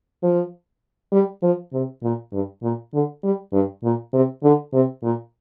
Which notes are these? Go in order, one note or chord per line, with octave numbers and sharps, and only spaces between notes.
F3
G3
F3
C3
A#2
G2
A#2
D3
G3
G2
A#2
C3
D3
C3
A#2